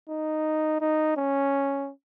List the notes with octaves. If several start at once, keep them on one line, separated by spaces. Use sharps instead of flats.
D#4
D#4
C#4